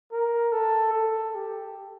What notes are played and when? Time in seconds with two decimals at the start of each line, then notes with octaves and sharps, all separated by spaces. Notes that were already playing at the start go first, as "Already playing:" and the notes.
0.12 A#4
0.52 A4
0.93 A4
1.35 G4